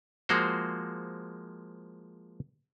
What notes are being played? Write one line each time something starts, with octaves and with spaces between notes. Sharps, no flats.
F3 G#3 A#3 F#4 C5